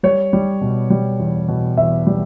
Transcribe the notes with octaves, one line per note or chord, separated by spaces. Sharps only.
G3 C#5
G3
B2
G3
E2
B2
E2 E5
G3